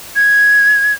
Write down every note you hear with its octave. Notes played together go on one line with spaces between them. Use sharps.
G#6